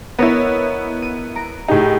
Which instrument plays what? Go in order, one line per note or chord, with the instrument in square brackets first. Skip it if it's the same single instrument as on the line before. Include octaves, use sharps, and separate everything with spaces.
[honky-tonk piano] B3 E4 [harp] A#4 C#5 D#5
[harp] D#7
A#5 D7
[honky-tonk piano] A2 D#4 [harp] G4 G#4